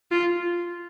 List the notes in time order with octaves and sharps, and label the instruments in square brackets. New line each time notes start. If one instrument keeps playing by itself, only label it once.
[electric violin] F4